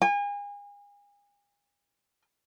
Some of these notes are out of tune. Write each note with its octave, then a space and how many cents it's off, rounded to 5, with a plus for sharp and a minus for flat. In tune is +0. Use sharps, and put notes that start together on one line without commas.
G#5 -35